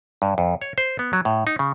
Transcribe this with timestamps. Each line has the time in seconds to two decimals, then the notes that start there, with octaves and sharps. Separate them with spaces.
0.22 G2
0.38 F2
0.62 C#5
0.78 C5
0.99 B3
1.13 F#3
1.25 A2
1.47 D#4
1.59 C#3